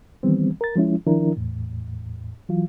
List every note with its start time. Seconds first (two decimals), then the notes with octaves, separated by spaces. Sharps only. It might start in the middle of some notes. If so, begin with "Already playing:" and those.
0.23 D#3 E3 G3 B3 C4
0.61 A#4 A6
0.76 F3 G#3 C#4 E4
1.06 D#3 F3 D4 E4 A#4
1.36 E2 A2
2.49 E3 F#3 F4